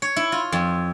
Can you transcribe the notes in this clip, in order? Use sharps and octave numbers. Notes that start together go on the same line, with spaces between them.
C#5
E4
F4
F2